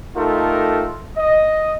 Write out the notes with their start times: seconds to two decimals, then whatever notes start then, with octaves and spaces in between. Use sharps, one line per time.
0.16 A3 D#4 F4 G4 A4 A#4
1.17 D#5